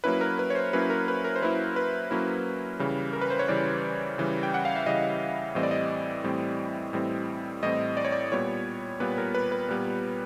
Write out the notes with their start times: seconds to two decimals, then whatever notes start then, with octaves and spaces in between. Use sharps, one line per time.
0.04 F#3 A#3 C#4 E4 B4
0.21 A#4
0.39 B4
0.50 C#5
0.55 C5
0.73 F#3 A#3 C#4 E4 B4
0.90 A#4
1.08 B4
1.24 A#4
1.36 C5
1.42 F#3 A#3 C#4 E4 B4
1.76 B4
2.11 F#3 A#3 C#4 E4
2.79 C#3 E3 G3
3.13 A#4
3.21 B4
3.30 C5
3.39 C#5
3.49 C#3 E3 G3 D5
4.18 C#3 E3 G3
4.43 G5
4.54 F#5
4.65 F5
4.76 E5
4.86 C#3 E3 G3 D#5
5.55 A2 E3 G3 C4 D#5
5.63 D5
5.71 D#5
6.24 A2 E3 G3 C4
6.93 A2 E3 G3 C4
7.63 A2 E3 G3 C4 D#5
7.97 D5
8.05 C#5
8.12 D5
8.32 A#2 G3 B3 C#5
9.00 A#2 G3 B3 B4
9.18 A#4
9.35 B4
9.52 B4
9.69 A#2 G3 B3